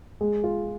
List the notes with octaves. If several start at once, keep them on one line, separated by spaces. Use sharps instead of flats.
G#3
F4